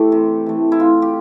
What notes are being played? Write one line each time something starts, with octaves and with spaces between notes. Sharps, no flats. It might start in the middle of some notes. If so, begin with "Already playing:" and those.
Already playing: E3 A3 G4 A4
C3
E3 A3
E4
C3 F4
G4